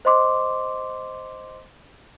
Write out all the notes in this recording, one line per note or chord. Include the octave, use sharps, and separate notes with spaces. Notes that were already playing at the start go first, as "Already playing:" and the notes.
C5 D#5 C6 D6